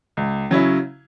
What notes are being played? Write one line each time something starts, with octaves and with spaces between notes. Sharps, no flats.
C#2
C#3 F#3 C#4 E4